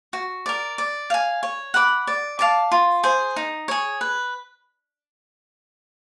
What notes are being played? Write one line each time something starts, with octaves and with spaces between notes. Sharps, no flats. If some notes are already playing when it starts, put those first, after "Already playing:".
F#4
A#4 D5
D5
F5 G#5
C#5
F#5 B5 D6
D5
F5 A5 D6
F4
G#4 C5
D#4
G#4 C#5
B4